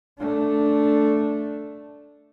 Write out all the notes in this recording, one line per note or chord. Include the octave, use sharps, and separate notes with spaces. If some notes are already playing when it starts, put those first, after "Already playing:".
A3 D4